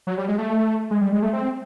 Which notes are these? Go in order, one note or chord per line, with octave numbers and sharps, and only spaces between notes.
F#3
G3
G#3
A3
G#3
G3
G#3
A3
C4